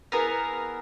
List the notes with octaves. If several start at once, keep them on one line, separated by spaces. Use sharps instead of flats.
B3 E4 G#4 A#4